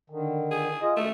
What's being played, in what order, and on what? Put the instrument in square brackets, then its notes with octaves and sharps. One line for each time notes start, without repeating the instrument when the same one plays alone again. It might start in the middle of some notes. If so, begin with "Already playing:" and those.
[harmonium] D3 D#3
[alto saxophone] G#4
[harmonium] F4 G#4 D#5
[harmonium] F#2 [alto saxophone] A3